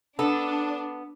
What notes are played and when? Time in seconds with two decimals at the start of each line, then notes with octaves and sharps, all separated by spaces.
0.19 B3 D4 A4